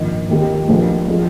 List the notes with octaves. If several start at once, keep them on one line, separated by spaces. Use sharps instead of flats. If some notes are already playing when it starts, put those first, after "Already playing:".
Already playing: A#1 G#2 D#3
D#2 D#3 G#3 D#4 G4
A#1 A#2 G#3
F3 G#3